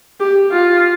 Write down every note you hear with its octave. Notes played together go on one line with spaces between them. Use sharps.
G4
F4